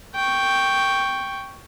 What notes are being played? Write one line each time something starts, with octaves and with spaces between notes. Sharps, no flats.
G5 C#6